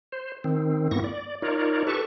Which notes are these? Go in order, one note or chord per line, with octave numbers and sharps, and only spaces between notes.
C5
D#3 C4
G2 A#3 B3 E4 C#6 A#6
D5
D#4 F4 A#4 C#5 D5
G4 A4 B4 A5 C#6